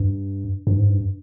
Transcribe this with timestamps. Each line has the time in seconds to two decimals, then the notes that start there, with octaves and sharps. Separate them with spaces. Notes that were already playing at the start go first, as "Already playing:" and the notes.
Already playing: G2
0.67 G2
0.78 G#2
0.89 G2